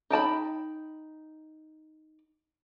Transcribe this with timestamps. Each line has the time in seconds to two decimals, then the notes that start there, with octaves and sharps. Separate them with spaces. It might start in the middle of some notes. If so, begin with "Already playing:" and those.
0.10 D#4 G5 A5 B5